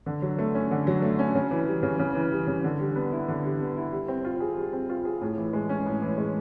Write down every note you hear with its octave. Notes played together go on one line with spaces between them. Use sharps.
D3
F#3
A3
C#4
D3
F#3
A3
C#4
C#3
E3
G3
C#3
C#3
E3
G3
C#3
D3
G3
B3
E4
D3
G3
B3
E4
G3
C4
F4
G#4
G3
C4
F4
G#4
A2
E3
G#3
C#4
A2
E3
G#3